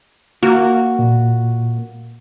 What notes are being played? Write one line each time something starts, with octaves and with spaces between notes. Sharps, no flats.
A#3 F#4
A#2